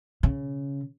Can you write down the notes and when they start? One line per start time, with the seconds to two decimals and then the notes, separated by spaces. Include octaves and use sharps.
0.23 C#3